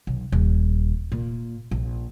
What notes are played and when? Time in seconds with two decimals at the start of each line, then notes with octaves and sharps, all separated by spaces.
0.07 B1
0.32 D#1
1.12 A#2
1.71 A#1